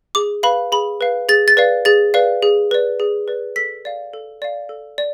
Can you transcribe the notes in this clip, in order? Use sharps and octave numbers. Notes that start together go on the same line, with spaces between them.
G#4 D6
B4 F5 B5
G#4 B5
B4 F5
G#4 A6
A6
B4 D5 F5
G#4 A6
B4 D5 F5
G#4
B4 D5
G#4
B4 D5
A4 B6
D5 F5
A4
D5 F5
A4
D5